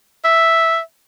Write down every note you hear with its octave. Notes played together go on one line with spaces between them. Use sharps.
E5